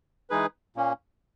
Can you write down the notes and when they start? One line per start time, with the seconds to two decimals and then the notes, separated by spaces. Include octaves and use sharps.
0.30 E3 G#3 D#4 G#4 B4
0.76 A#2 A#3 C#4